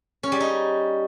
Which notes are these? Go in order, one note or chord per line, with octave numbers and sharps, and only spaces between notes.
C#4
G3
D#4